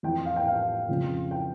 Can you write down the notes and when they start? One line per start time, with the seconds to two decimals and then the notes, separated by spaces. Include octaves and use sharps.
0.03 F2 E3 G5
0.25 F5
0.36 G5
0.48 F5
0.88 F2 C#3 F3
1.31 G5